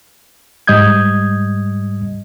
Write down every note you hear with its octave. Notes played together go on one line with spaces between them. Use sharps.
G#2 G3 D#5 D#6 G6 G#6